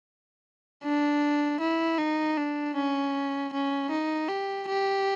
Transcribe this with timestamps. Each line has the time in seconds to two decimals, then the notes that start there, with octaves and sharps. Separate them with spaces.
0.84 D4
1.60 E4
1.98 D#4
2.38 D4
2.75 C#4
3.53 C#4
3.91 D#4
4.29 G4
4.68 G4